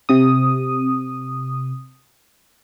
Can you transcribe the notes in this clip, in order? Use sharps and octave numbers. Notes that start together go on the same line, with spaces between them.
C3 D#6